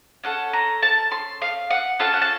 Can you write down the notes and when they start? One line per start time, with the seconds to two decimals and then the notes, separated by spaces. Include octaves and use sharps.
0.24 C#4 A4 F#5
0.53 A#5
0.82 A5
1.11 C6
1.42 F5
1.71 F#5
1.99 C#4 F4 A4 A5
2.14 F#5
2.22 A5